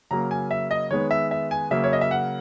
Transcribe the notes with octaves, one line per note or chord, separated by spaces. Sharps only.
C#3 F#3 A#3 A#5
G#5
E5
D#5
D#3 G#3 B3 C#5
E5
E5
G#5
C#3 F#3 A#3 E5
C#5
D#5
E5
F#5